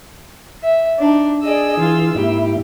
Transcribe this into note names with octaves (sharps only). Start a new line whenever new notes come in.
E5
D4 D#4
G#4 D5 D#5 E6
E3 F4
G#2 A#3 E4 G4